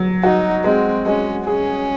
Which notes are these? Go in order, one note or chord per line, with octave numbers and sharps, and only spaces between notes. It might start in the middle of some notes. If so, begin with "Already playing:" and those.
Already playing: F#3
D#4 F#4
G#3 C4
G#3 C#4
C#4 G#4